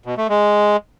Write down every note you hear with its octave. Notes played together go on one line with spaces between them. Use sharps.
B2
A3
G#3